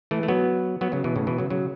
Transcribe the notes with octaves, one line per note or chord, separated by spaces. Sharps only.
E3 A3
A3
F#3 B3
F#3 B3
C#3 F#3
B2 E3
A2 C#3
B2 E3
C#3 F#3
C#3 F#3